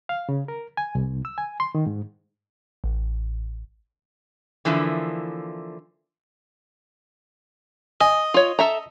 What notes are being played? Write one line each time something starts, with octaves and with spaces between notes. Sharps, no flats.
F5
C#3
A#4
G#5
C2
E6
G#5
C6
D#3
G#2
A1
D3 E3 F3 A#3 E4
D#5 G#5
F4 C#5
A4 E5 A#5